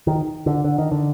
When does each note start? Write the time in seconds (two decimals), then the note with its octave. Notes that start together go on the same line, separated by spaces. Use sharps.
0.07 D#3
0.46 D3
0.64 D3
0.78 D#3
0.92 D3